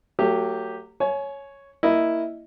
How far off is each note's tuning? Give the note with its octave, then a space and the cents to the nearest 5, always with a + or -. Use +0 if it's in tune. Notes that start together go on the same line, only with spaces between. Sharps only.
F#3 +0 A3 +40 G4 +0
C#5 +0 G#5 +30
A#3 +0 E4 +0 D#5 +0